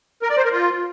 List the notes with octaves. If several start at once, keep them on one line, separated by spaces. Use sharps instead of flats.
A#4
D5
C5
A#4
F4